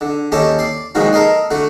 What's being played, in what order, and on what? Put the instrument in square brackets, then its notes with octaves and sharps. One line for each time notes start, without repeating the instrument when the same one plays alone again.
[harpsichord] D3
D#2 C#4 G4 A4 D#5 A5
D5 C6
A#2 D#3 F3 G#3 D#4 F#4
A4 A#4 D#5 C6
D3 A3 F#4